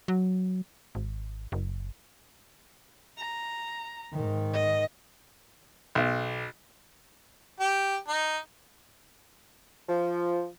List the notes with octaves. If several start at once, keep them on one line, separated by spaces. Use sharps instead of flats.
F#3
G#1
F#1
A#5
G#2 D#3
D#5
B1
G4
D#4
F3